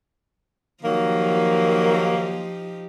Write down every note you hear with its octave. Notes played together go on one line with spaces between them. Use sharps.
D#3 F3 F#3 A#3 D#4 G4